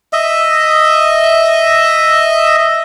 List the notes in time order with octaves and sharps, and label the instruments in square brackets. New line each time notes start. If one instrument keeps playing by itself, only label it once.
[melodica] D#5 E5